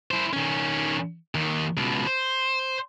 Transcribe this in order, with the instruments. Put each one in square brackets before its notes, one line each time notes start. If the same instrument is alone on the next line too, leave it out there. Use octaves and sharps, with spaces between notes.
[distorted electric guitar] E4 C5
D#3 C#4
D#2 D#3
C#2 B2
C5